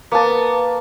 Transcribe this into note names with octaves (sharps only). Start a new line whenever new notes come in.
A#3 B3 A5